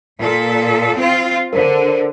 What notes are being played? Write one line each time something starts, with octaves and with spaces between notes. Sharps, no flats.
A#2 A4
C4 F4
D3 A#4 C5